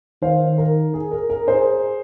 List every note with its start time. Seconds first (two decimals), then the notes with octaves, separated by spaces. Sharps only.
0.22 D#3 C5 F5
0.58 A#4
0.94 G#4
1.12 A#4
1.30 A#4
1.47 G#4 C5